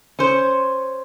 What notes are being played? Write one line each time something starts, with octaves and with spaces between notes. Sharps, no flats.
C#4 C5